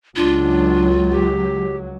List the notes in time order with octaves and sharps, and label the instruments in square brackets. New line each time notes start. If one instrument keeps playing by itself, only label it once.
[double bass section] C#2 F#3 [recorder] D4 [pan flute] F4
[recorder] G4